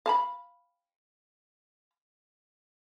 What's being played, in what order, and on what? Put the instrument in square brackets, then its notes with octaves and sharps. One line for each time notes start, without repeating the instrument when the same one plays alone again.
[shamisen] F5 A5 B5